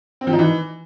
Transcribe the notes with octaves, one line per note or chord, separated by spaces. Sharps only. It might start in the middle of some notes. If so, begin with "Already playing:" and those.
C4
F3
D#4
E3